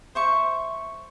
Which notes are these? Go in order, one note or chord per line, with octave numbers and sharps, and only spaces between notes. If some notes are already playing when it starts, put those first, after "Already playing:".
C5 E5 C#6